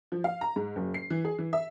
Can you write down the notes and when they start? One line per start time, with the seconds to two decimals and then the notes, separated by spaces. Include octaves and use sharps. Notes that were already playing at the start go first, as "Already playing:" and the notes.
0.12 F3
0.24 F5
0.41 A#5
0.56 G#2
0.76 F#1
0.94 C7
1.10 E3
1.25 G#4
1.39 E3
1.53 E5